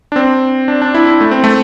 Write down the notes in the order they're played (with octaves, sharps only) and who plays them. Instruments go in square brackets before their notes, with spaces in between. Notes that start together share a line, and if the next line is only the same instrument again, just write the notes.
[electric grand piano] D4
C4
D4
D4
E4
E4
A3
C4
A3